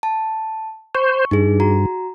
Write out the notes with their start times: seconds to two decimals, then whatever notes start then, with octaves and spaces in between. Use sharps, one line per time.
0.03 A5
0.95 C5 C#6
1.31 G2 D#4 G#4
1.60 F#4 A#5